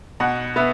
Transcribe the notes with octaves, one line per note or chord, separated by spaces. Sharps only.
B2 F#5
B3 E5